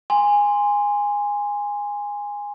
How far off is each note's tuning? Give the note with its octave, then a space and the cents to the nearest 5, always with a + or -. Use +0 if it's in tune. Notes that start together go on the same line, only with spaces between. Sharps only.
G#5 -15 C6 -5